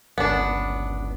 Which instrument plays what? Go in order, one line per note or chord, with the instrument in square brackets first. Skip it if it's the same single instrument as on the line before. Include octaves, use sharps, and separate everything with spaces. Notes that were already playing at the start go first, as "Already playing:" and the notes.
[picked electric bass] G1 C#2 [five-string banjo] B3 D4